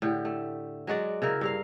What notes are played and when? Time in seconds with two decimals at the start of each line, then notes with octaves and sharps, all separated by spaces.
0.02 A2 D3 G4
0.25 A3
0.87 F#3 G#3 F#4 D5
1.22 C#3 E4 A#4
1.41 G2 A#4 F5